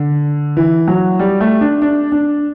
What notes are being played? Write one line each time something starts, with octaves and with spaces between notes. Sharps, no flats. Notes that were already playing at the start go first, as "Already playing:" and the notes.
Already playing: D3
E3
F#3
G3
A3
D4
D4
D4